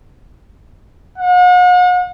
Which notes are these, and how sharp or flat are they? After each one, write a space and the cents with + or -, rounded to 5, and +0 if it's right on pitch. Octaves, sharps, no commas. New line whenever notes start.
F#5 -40